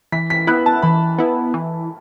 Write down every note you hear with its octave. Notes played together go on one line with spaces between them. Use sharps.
E3 B6
B6
B3 E4 F#6
A5
E3 B5
B3 E4
E3